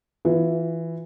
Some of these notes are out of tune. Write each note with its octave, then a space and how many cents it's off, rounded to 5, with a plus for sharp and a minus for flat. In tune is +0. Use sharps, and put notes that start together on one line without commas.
E3 +0 F4 +20